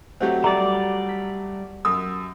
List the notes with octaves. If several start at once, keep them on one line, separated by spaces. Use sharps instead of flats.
F#3 A3 C4 G4 F#5
F#3 G3 A3 D5 A#5
B6
F#2 D#6 E6